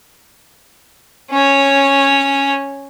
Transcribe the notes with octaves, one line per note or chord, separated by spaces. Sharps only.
C#4 C#5